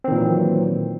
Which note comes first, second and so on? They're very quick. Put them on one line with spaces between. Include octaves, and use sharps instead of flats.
C4 D#3 A#2 E3 F#3